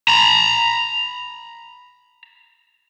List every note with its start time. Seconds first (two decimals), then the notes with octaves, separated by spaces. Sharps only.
0.08 A#5 B5